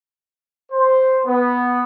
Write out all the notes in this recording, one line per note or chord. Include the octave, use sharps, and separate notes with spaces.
C5
B3